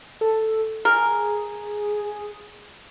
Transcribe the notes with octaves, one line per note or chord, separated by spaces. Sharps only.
A4
G#4 A#4